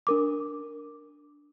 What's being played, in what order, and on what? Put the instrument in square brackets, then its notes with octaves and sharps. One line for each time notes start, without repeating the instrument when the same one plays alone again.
[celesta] D4 A#4 D6